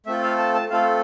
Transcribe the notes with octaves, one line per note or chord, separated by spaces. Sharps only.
A3 C4 F4 A4 E5
F5
A5
A5
A3 C4 F4 A4 F5